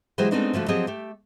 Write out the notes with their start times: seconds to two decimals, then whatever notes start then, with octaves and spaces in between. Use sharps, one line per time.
0.18 E3 F#3 G#3 G4 G#4 C5
0.31 G#3 A3 B3 C4 D4 D#4
0.53 D3 F3 A3 F#4
0.68 F3 F#3 C4 G4 G#4 D#5
0.87 A3 G4